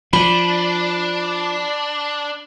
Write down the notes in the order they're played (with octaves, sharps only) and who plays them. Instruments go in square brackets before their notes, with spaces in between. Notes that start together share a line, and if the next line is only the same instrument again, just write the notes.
[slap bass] F3 [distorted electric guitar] D4 [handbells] B5